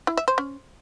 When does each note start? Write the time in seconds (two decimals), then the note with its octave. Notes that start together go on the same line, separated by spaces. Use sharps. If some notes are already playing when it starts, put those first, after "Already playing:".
0.07 E4
0.17 E5
0.28 C5
0.38 C#4